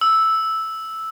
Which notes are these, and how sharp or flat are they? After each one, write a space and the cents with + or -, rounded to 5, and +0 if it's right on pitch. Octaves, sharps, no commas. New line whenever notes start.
E6 -5